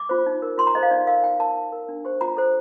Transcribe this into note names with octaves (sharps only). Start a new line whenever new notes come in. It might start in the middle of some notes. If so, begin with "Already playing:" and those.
Already playing: D6
F4 C5
D#4
A#4
F4 C6
A#5
A4 C5 D#5
F5
D#4 D5
A#4 F5
D#4 G5
A#4 A5
D#4
A#4
D4
G4 C5
F4 A#5
A4 C5